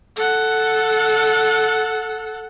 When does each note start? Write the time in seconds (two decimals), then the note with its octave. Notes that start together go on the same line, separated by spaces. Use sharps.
0.16 A4 F#5